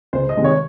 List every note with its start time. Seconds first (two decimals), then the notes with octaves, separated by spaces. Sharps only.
0.13 C#2 C5
0.29 D#5
0.37 C3 D#3 G#3
0.44 C#5